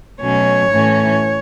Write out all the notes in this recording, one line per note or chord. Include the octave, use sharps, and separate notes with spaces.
B2 F#3 A3 C#4 C#5
A2 E3 A3 C#4